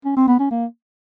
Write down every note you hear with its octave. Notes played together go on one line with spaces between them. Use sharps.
C#4
C4
B3
C#4
A#3